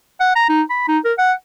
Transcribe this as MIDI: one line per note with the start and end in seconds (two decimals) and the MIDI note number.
0.21 0.31 78
0.36 0.48 82
0.49 0.62 63
0.70 0.86 83
0.89 0.99 63
1.05 1.13 70
1.19 1.33 78